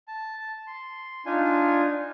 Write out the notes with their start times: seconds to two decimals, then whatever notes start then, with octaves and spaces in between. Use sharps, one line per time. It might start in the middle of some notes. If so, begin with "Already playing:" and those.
0.08 A5
0.67 C6
1.26 D4 D#4 F4 G#5